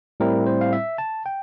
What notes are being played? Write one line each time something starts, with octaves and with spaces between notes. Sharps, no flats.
A2 G3 C4 E4 A#4
C5
F5
E5
A5
G5